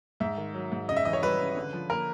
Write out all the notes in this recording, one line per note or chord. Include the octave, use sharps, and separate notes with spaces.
G#2 E5
D#3
F#3
G#2
C#3 D#5
E5
E3 D#5
C#5
G3 B4
C#3
D3
F3
A#3 A#4